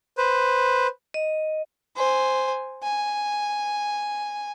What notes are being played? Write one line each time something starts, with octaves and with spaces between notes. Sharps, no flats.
B4 C5
D#5
C5 G#5
G#5